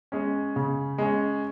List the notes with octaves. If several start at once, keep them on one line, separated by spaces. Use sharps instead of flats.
G#3 C#4
C#3
G#3 C#4